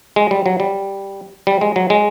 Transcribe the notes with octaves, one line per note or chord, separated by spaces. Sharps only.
G#3
G3
F#3
G3
G3
G#3
F#3
G#3